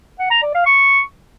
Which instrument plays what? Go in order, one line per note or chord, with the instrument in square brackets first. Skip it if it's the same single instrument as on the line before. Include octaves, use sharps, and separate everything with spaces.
[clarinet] F#5
A#5
D5
F5
C#6